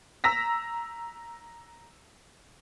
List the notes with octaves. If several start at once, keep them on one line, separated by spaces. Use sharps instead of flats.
A#5 E6 A#6 B6